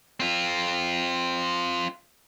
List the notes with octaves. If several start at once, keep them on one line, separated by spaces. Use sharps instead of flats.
C4 F4